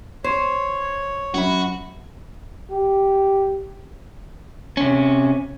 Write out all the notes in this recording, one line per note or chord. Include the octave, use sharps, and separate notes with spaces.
C5 C#5
F#2 F#4 B5
G4
C3 C#4